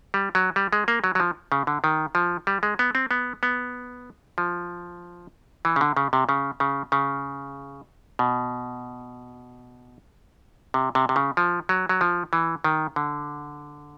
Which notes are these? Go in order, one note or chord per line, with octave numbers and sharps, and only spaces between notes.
G3
F#3
G3
G#3
A#3
F#3
F#3
F3
C#3
D3
D#3
F3
G3
G#3
B3
C4
B3
B3
F3
E3
C#3
D3
C#3
C3
C#3
C#3
C#3
B2
C3
C3
C3
C#3
F3
F#3
F#3
F3
E3
D#3
D3